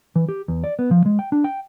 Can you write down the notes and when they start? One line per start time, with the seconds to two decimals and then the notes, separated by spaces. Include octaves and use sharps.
0.16 E3
0.29 G4
0.48 E2
0.64 D5
0.79 B3
0.91 F3
1.06 G#3
1.19 G5
1.32 D4
1.44 G5